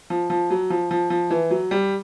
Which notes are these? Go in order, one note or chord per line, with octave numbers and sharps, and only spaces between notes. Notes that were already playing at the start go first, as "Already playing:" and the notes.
F3
F3
F#3
F3
F3
F3
E3
F#3
G3